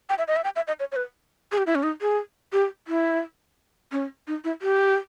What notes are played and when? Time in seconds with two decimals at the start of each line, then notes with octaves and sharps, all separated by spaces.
0.10 G5
0.18 E5
0.28 D#5
0.36 E5
0.44 G5
0.56 E5
0.67 D#5
0.80 C#5
0.92 C#5
0.96 B4
1.52 G#4
1.58 G4
1.67 E4
1.75 C#4
1.83 D#4
2.02 G#4
2.53 G4
2.88 E4
3.92 C#4
4.27 D#4
4.44 E4
4.62 G4